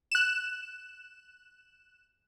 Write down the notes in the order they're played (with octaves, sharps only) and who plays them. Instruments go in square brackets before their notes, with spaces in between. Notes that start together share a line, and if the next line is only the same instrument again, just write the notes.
[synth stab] F#6 E7